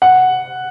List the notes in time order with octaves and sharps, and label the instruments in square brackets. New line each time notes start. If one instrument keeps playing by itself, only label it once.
[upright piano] F#5